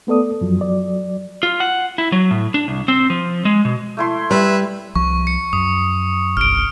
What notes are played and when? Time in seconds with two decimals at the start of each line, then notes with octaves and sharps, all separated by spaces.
0.07 A3 B3 A4 D5 D#6
0.41 F#2 F3 F#3
0.61 F#3 D5
1.43 F4
1.60 F#5
1.98 E4
2.12 F#3
2.31 A2
2.54 D4
2.68 C2
2.88 C4
3.10 F3
3.45 G#3
3.65 B2
3.97 A3 E4 C6
4.31 G3 B4 E5
4.96 C2 F3 C#6
5.27 C#7
5.53 F#2 D#6
6.37 G1 C2 F6 D7